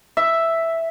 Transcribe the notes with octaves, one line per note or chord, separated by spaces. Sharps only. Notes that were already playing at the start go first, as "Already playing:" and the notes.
E5